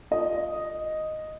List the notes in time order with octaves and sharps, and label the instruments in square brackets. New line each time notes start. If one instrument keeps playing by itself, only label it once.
[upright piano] F4 D#5